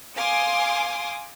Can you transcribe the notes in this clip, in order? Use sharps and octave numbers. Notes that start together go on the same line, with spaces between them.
F5 G#5 C6 D6 D#6